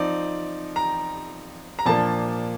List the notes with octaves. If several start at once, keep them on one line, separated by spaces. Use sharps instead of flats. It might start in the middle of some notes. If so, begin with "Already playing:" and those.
Already playing: F3 C4 D#4 D5
A#5
A#5
A#2 F3 A#3 D4 A5